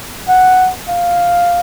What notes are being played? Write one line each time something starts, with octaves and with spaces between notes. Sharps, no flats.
F#5
F5